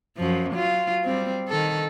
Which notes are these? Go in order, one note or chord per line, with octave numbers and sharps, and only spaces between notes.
F#2 F3
F#3 F4
G3 C4
D#3 A4